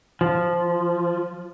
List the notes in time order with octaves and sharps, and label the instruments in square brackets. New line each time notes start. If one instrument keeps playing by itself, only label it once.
[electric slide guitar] F3